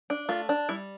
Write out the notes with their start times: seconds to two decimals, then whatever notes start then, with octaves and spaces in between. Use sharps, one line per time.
0.10 D4
0.29 A3 F4
0.49 D4
0.69 G3 E4